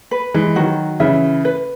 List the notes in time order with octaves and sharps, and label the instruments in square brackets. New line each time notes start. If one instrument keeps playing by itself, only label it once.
[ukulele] B4
[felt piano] E3 G#3
[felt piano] D#3 F#3 [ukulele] F#4
[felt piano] C#3 E3 [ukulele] E5
[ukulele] B4